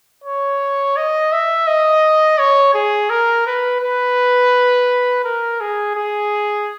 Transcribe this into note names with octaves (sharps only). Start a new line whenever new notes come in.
C#5
D#5
E5
D#5
C#5
G#4
A#4
B4
B4
A#4
G#4
G#4